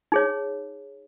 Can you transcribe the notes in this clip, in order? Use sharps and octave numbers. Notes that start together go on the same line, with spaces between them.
D#4 G#4 C#5